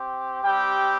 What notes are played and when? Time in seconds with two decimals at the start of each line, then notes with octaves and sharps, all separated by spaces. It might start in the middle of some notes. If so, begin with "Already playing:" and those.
Already playing: C4 G4
0.43 G3 C4 G4 G5